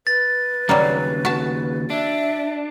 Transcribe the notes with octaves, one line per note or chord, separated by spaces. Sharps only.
B4 A6
D#2 C#3 F#3 G3 A#3
F#4 A5
D4 E5